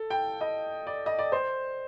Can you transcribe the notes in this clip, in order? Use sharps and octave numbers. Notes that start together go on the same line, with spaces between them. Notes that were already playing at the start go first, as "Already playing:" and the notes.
Already playing: A4
G5
D#5
D5
D#5
D5
C5